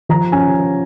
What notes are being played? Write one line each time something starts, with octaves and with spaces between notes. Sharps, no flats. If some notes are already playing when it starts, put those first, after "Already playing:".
F3 A#5
C#4 G#5